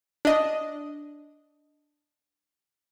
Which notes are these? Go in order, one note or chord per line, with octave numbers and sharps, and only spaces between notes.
D4 D#5